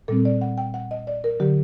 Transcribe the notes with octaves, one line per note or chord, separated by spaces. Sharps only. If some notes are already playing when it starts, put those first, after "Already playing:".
A#2 G3 C4 A4
D5
F#5
G5
F#5
D#5
D5
A#4
D3 F#3 G4